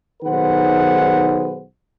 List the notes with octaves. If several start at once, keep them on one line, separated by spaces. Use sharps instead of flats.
B1 D#3 G#4 B4 C5 F#5